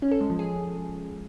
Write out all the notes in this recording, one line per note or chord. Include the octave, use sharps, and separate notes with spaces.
C#4
A4
G#3
F3
G#4